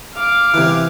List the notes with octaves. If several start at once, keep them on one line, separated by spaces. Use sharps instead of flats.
F5 D6
C3 E3